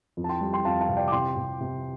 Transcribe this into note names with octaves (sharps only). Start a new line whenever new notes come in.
F2
A5
G5 C6
G3
G5 C6
F2 F5 A5
F5 A5
C3
D5 G5
D6
C3 G5 C6
C3
C3